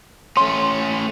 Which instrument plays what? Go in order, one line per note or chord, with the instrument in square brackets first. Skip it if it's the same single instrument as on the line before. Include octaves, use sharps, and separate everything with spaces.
[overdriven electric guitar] A3 C#4 [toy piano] C6